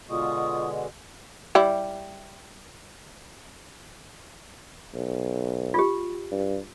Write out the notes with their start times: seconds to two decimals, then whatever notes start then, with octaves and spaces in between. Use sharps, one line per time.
0.09 B2 D3 G#3 F4 C#6 D#6
1.55 G3 E4
4.95 B1
5.74 F4 G4
6.31 G2